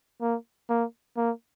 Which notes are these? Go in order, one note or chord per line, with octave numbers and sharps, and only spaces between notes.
A#3
A#3
A#3